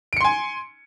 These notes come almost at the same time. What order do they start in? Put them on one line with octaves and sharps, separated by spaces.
D7 C#7 C6 G#5